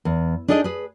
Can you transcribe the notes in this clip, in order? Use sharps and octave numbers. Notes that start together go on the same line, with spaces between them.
E2
D4 D#4 G#4 A4 D#5
G#4 B4